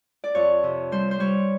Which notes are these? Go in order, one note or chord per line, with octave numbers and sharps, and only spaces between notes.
D5
F2 C#5
C3
G3 C5
C5
G3 C#5